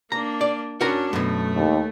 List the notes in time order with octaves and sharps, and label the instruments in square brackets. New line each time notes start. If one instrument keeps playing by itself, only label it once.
[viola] A#3 D4 [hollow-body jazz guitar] A#5
[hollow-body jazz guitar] D5
[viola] C#4 D4 [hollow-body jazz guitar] F#4 A#4 A#5
[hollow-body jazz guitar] F#2 B2 [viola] A3
[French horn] D#2